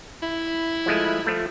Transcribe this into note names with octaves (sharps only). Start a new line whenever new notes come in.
E4
F3 G#3 A3
F3 A3